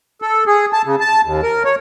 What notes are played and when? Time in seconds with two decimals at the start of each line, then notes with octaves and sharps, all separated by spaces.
0.22 A4
0.47 G#4
0.73 A5
0.85 C#3
1.00 A5
1.24 D#2
1.43 A#4
1.65 C#5